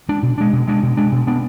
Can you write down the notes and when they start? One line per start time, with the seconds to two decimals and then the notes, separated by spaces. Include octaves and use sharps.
0.09 G#3 D4
0.23 B2
0.38 G#3 D4
0.53 B2
0.68 G#3 D4
0.83 B2
0.97 G#3 D4
1.12 B2
1.27 B3 D4